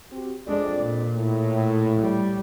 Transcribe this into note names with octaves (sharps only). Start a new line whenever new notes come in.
C4 F#4 G4
F2 G#3 D4 D5
A#2
A2
G3